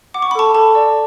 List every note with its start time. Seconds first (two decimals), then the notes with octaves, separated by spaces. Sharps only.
0.14 F#5 D6
0.22 C#6
0.31 B5
0.35 A4 A5 C#6
0.55 A4 A5
0.75 D5